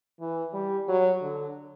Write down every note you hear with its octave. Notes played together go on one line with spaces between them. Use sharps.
E3
G3
F#3
D3